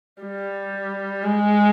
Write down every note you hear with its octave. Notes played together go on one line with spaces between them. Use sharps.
G3
G#3